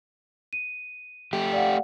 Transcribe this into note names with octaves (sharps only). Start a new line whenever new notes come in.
D#7
A3 G4
D5 F5 F#5